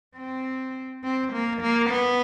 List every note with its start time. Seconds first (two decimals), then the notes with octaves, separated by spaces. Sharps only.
0.17 C4
1.03 C4
1.33 A#3
1.61 A#3
1.90 B3